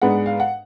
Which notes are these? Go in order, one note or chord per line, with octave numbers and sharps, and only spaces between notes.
G#2 G#3 B3 D4 F#5
F5
F#5